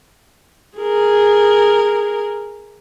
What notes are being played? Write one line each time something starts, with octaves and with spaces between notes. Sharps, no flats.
G#4 A#4